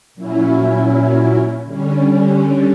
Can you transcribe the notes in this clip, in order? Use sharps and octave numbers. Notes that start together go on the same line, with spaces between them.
A#2 F#3 C#4 E4
D3 G3 C#4